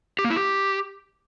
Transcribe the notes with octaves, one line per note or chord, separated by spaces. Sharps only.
G4
A#3
E4
G4